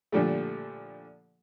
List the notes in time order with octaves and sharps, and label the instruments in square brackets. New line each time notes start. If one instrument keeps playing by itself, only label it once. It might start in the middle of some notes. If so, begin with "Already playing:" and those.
[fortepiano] A#2 D3 F3 G3 A3